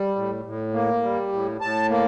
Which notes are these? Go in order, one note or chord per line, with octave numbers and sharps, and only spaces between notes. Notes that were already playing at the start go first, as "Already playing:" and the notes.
Already playing: G3
A2
A2
A#3
G3
A2
A2 A5
A#3